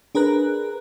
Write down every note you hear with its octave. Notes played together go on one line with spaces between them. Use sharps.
D4 G#4 A#4 B4 A#5 F#6